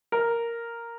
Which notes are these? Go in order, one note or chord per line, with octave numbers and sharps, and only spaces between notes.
A#4